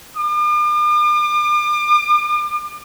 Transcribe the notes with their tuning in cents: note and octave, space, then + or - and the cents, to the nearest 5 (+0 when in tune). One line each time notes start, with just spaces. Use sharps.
D6 +45